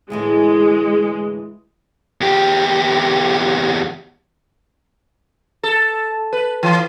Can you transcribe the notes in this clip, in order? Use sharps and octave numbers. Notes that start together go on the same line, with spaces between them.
D2 A2 E3 G#3
E2 G4
A4
B4
E3